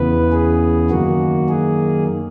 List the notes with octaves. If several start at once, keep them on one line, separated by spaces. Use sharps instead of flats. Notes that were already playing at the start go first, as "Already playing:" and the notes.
Already playing: E2 C#3 E3 B3 B4
G#4
F#2 D#3 A#3 F#4
G#4